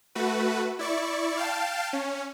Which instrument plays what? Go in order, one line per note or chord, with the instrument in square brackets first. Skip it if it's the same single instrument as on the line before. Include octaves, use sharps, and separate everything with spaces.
[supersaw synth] A3 F#4 B4
E4 D5 C#6
F5 G5 A5
C#4